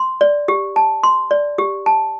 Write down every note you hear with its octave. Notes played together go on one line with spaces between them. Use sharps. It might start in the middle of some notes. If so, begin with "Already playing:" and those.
Already playing: C6
D5
G4
A5
C6
D5
G4
A5